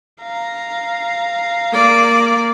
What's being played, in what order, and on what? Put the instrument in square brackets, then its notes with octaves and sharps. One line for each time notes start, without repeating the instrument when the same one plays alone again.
[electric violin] F5 A#5
[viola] A#3 D5